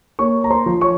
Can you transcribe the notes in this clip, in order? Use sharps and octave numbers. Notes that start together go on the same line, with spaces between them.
A#3 C#5 C#6
A#5
C5 C6
F3
C#5 C#6